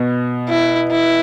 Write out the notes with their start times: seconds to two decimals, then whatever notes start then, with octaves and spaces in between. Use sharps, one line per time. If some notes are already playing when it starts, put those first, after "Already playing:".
Already playing: B2
0.48 E4
0.91 E4